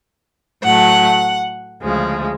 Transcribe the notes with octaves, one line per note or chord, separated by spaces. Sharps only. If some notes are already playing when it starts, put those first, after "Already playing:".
A2 F#3 A3 F#5
D2 C#3 F3 G#3